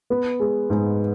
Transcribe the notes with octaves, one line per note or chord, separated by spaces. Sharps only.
B3
G#3
G#2